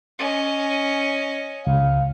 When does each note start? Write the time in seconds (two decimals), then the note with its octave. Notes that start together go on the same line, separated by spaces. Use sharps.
0.19 C#4 D#5
1.67 C#2 F5